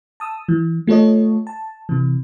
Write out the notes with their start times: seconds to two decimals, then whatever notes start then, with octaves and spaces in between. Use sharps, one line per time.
0.20 A5 D#6 E6
0.49 E3
0.87 A3 F4 A4 C#5 D#5
1.47 A5
1.89 C3 E3